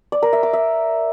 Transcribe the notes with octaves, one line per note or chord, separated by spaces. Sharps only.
D5
A#4
E5
D6
E5